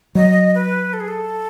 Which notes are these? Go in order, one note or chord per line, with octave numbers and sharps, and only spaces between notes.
F#3 D#5
B4
A4
G#4
A4